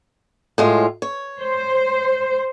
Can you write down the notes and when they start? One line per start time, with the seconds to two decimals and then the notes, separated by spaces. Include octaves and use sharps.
0.58 A2 G#3 F4
1.02 C#5
1.40 C5